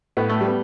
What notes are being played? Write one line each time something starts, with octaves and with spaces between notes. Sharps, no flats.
A2 B3
A3
G3
B3